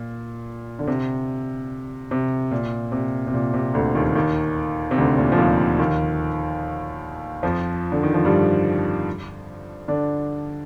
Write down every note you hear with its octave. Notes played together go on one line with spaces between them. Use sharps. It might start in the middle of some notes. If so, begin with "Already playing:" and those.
Already playing: A#2
D3
C3
C3
A#2
C3
C3
A#2
C3
D2 D3
D#2 D#3
D#2 D#3
C3
D2 D3
A#2
F3
D#2 D#3
D#2 D#3
F2 F3
D3
D#3
F3
G2 G3
D3 D4